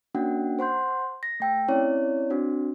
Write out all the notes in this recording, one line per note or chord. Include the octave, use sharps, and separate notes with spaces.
A#3 C#4 D4 F#4 F#5 G5
C5 F#5 C6 G6
A#6
A3 G5 E6
C4 C#4 E4 C#5 D5
C4 D4 F#4 C5